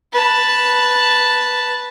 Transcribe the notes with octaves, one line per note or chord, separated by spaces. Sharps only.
B4 A5